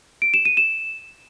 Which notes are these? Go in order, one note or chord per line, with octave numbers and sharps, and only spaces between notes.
D7
E7
D#7
E7